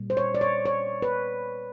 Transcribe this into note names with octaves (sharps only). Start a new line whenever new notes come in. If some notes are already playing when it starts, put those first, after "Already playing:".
Already playing: A#2 G3 A#3
C5
C#5
D5
C#5
C#5
B4